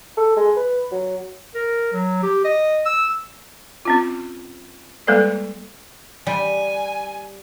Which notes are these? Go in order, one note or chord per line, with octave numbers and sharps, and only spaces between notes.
A4
G#3
B4
F#3
A#4
F#3
G4
D#5
E6
C4 C#4 F4
G3 G#3 A#3 A4 B4 D5
G3 G#5